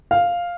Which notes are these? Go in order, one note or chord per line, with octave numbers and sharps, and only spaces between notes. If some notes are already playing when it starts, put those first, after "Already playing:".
F5